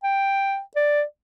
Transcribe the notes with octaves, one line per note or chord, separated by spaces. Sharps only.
G5
D5